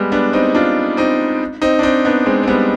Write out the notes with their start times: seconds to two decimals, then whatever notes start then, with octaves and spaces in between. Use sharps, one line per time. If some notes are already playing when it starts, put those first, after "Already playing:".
Already playing: G3 G#3 B3
0.12 B3 D4
0.33 C4 D#4
0.55 D4 F4
0.97 C4 D#4
1.62 C4 D#4
1.79 D4
1.83 C4 D#4
2.05 B3 D4
2.26 G#3 C4
2.43 C4
2.47 G3 B3